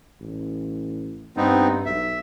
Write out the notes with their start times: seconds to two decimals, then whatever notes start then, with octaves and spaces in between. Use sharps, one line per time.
0.20 A1
1.37 G2 B3 C4 D#4
1.86 B1 E5